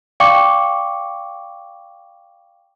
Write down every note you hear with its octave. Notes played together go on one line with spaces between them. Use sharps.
D5 F5 G5 C#6 D6 C#7